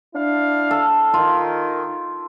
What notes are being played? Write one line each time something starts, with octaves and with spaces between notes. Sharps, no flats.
D4 E4 F5
A4
D#3 F4